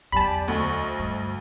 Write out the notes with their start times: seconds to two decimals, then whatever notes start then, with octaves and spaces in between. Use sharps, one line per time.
0.12 E2 F#3 G4 D5 G#5 A5 B5
0.48 D2 C5 D#5 C#6
0.99 G2